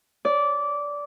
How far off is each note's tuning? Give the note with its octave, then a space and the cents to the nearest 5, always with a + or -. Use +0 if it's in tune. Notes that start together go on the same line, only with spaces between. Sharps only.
D5 -15